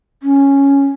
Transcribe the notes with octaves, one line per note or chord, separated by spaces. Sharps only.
C#4